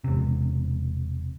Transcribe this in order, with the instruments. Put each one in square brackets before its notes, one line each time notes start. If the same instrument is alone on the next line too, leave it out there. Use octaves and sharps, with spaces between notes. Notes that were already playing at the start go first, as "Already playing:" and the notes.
[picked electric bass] E1 C3